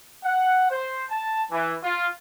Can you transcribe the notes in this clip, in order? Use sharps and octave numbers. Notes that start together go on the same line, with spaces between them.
F#5
C5
A5
E3
F4